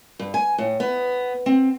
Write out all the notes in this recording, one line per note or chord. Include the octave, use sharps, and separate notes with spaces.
G2
G#5
A2
B3
C4